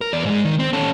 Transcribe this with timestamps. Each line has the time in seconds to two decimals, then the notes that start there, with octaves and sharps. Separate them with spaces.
0.01 A#4
0.13 E2 D5
0.26 G#2 G#3
0.44 D#3
0.59 C4
0.73 C#4 A4